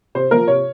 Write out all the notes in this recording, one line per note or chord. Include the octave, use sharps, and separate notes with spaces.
C3 C5
F3 A#3 A#4
C3 C#5